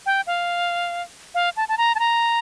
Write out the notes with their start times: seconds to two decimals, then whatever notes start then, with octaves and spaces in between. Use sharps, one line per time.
0.06 G5
0.27 F5
1.34 F5
1.56 A5
1.68 A5
1.77 A#5
1.95 A5
1.99 A#5